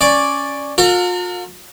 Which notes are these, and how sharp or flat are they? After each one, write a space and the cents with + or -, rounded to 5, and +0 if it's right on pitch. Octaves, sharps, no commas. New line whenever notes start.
C#4 +0 D5 +0
F4 +40 A#4 -45